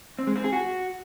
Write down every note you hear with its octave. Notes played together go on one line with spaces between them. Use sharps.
C4
G#3
C4
G#4
F#4